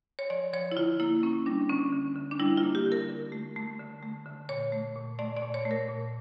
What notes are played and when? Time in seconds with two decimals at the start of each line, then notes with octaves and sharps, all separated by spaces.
0.19 C#5
0.30 F3 D5
0.53 F3 C#5
0.72 E4
0.76 D3 F4
1.00 A#3 E4
1.23 A#3 C#4
1.46 G3 D4
1.69 D3 C#4
1.93 D3
2.16 D3
2.31 D4
2.39 G3 E4
2.57 F4
2.63 A#3
2.75 G4
2.85 D3
2.92 A#4
3.09 D3
3.32 A3
3.56 A3
3.79 D3
4.03 A3
4.26 D3
4.49 A#2 C#5
4.72 A3
4.96 A#2
5.19 A3 D5
5.37 D5
5.42 A#2
5.54 C#5
5.65 A3
5.71 A#4
5.88 A#2